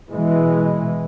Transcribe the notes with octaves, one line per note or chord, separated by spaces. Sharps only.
B2 E3 G#3